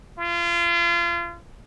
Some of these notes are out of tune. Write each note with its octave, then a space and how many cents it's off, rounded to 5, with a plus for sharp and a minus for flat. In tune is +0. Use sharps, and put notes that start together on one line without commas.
F4 -30